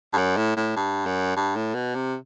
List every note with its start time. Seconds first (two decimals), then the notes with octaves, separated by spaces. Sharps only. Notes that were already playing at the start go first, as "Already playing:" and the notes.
0.13 G2
0.18 F#2
0.37 A2
0.57 A2
0.76 G2
1.06 F#2
1.36 G2
1.56 A2
1.74 B2
1.95 C3